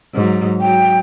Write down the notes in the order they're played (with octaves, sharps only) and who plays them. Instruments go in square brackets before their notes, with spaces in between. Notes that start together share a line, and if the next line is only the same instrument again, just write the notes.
[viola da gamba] G#2 F#3
[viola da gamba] F#3 [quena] G5